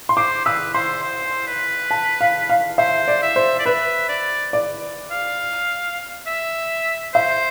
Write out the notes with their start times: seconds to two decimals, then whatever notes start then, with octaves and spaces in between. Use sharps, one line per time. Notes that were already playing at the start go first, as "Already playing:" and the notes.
0.09 C6
0.17 C5 D6
0.45 B4 E6
0.74 C5 C6
1.04 C5
1.47 B4
1.91 A5
2.21 F5
2.49 F5
2.78 C5 E5
3.08 D5
3.22 E5
3.36 C5
3.59 D5
3.66 B4 E5
4.09 D5
4.53 D5
5.11 F5
6.27 E5
7.14 C5 E5